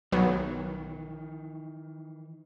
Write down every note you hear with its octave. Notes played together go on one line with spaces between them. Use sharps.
B1 D#3 E3 F#3 B3